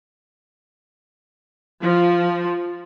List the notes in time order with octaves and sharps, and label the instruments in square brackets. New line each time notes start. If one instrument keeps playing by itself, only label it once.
[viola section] F3